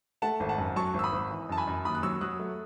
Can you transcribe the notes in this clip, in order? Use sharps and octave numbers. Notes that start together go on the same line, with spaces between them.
A3 F#5 A5
G#1
F#5 A5
F#2
F#3 A5 C#6
G#1
E6
B5 D#6
G#1
E3
F#2 A5
G#5 B5
F#2
D#2 B5 D#6
F#6
F#3 C#6 E6
F#3 D#6 F#6
A3